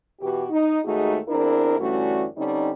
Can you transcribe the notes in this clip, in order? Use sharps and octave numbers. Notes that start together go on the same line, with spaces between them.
B2 E3 F#4 G4
D#4
D#2 G#3 A3 D#4 F#4 G#4
E2 C4 D4 E4 A#4
G2 D3 E3 A3 C#4 F#4
D3 G3 C4 C#4 D#4